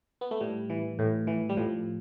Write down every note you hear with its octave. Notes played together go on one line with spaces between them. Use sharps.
B3
A3
A2 G3
E3
A2
E3
G3
A2 F3